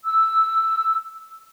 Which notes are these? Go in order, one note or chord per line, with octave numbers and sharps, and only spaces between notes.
E6